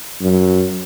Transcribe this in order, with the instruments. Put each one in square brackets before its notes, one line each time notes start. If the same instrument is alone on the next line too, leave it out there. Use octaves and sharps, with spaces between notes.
[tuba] F#2